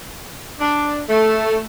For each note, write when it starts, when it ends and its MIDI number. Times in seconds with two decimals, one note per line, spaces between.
0.60 1.00 62
1.09 1.61 57